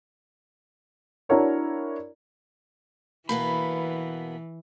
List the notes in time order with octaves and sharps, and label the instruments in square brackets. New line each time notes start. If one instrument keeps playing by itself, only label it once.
[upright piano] D4 E4 F#4 A#4 C#5 D5
[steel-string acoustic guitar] B2 A#3 B3 [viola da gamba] E3 [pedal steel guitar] B5